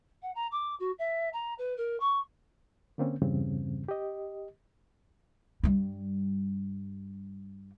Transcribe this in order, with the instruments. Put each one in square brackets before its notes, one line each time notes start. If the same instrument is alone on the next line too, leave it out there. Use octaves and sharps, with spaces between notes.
[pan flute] F#5
A#5
D6
F#4
E5
A#5
B4
A#4
C#6
[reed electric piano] D3 A#3 C4 C#4
E2 G2 C#3 G3 C4
G4 D#5
[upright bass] G2 G3